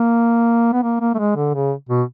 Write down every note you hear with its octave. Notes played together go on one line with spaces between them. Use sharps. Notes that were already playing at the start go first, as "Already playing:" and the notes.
Already playing: A#3
B3
A#3
A#3
A3
G#3
D3
C#3
B2